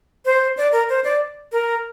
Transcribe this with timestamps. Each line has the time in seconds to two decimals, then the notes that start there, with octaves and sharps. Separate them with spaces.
0.25 C5
0.57 D5
0.72 A#4
0.89 C5
1.04 D5
1.52 A#4